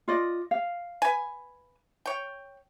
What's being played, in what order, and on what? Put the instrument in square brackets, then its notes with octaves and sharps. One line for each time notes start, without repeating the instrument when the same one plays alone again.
[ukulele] F4 D5 D#5
F5
[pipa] B4 G#5
C#5 G5